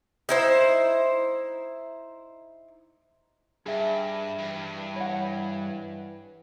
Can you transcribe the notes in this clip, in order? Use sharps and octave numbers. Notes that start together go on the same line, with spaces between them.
D#4 E4 C5
G2 G#4 E5
G2 E3
C#5 F#5